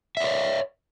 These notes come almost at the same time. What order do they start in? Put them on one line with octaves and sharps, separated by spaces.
E5 D5 C#5